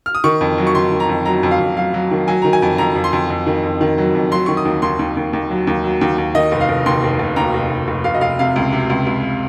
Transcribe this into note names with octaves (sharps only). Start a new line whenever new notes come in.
F6
D#6
D#3 C#6
F2
F#3
C#6
D#3 C6
D#3
A#5
F2
F#3 A#5
F2
F5
F2
F#3 F5
F#3
D#3
F#3 G#5
D#3 A#5
G#5
F2
F2 A#5
F2
C6
F2
F2
D#3
F2
D#3
F#3
F2
F#3 C6
D#3 C#6
D#6
D#2
D#2 C6
D#2
D#2
D#2
F#3
D#2
F#3
D#2
D#2
D#3 D#5
F1
F5
F1
D#2 C6
F1
F1
D#2 A#5
F1
F1
F1
F1 F5
D#5
F1 F5
C3 F5
C#2
C3
C#2
C#2